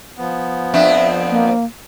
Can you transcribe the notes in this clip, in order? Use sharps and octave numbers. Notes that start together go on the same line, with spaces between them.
F3 B3
F2 C4 D4 E5
A#3